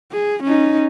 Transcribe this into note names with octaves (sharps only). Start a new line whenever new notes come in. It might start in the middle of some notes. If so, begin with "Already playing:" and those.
G#4
C#4 D#4